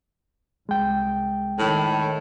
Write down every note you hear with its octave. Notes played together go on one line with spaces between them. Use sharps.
C2 G#3 G5
A2 D#3